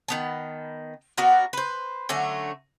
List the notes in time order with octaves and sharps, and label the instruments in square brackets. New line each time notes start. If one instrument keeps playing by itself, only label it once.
[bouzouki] D#3 B3 A5
B3 D4 F#4 A#4
B4 C5
D3 F#3 A3 C#4